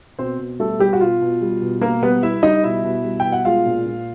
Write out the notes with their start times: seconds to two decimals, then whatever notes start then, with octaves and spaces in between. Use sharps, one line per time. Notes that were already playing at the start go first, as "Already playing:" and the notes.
0.19 B2 C4 C5
0.39 B2
0.60 G3 A3 A4
0.79 G3 G4
0.93 F#4
1.01 B2 F4
1.21 B2
1.41 G3
1.62 B2
1.81 B2 A#3 A#4
2.02 G3 B3 B4
2.23 G3 E4 E5
2.43 G3 D#4 D#5
2.63 B2 E4 E5
2.84 B2
3.04 G3
3.20 B2 G5
3.32 F#5
3.45 G#3 F4 F5
3.66 A#2
3.86 A#2